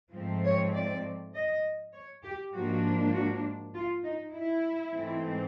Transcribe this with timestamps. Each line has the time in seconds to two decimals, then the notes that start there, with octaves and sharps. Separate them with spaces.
0.13 G#2 F3 A3 C4
0.44 C#5
0.74 D5
1.34 D#5
1.94 C#5
2.24 G4
2.53 G#2 F3 A#3 D4 F#4
3.14 F#4
3.74 F4
4.04 D#4
4.34 E4
4.94 G#2 E3 A3 C4